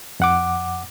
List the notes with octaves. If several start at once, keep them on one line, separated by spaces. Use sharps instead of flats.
F2 F#5 D6